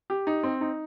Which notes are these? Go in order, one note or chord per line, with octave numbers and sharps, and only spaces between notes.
G4
D#4
C4
D#4